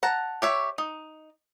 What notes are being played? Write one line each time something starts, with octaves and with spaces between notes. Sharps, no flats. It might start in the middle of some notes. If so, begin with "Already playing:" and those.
F#5 A5 A#5
G4 C#5 E5
D#4